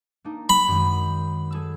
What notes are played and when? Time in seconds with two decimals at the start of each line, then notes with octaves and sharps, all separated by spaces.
0.24 A#3 D4 D#4
0.49 B5
0.68 F#2 D#3 G#3
1.51 G#4 A4 E6